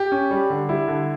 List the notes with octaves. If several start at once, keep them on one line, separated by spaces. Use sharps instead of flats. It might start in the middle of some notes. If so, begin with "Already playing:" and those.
Already playing: G4
C#4
G3
D3
G3 E4
D3